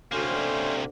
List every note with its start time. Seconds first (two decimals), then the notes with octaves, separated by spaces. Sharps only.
0.12 D2 C3 A#3 C#4 C5